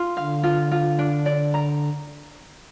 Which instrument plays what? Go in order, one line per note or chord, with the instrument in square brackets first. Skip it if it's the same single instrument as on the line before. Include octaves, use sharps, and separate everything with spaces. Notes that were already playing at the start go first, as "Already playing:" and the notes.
Already playing: [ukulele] F4
[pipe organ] D3 [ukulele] F5
[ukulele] F4
F4
D4
D5
A#5